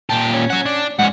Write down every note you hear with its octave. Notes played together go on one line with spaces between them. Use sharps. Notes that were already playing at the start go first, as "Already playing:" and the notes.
A#2 G4 A5
C#4
C#5 F#5
D4
G#2 C#4 F#5